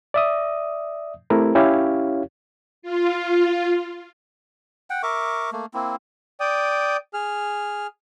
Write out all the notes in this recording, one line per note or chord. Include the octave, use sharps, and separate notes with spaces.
D5 E5 D#6
A3 C4 E4 G4 A#4
C#4 E4 G4 C#5 F5
F4
F#5 G5
A#4 E5 C#6 D6
A3 A#3
A#3 C4 E4
D5 G5 D#6
G#4 F6